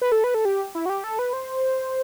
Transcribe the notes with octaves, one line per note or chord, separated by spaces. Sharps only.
B4
A4
B4
A4
G4
E4
F#4
G4
A4
B4
C5